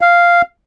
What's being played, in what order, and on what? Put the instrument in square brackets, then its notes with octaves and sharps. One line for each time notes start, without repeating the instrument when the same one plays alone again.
[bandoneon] F5